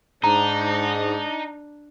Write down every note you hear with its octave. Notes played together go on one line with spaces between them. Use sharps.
G#2 D4 D#4 A#5